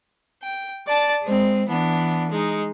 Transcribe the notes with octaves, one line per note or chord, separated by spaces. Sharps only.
G5
D5 A5 A6
G#3 C4
E3 B3 D4
G#3 D#4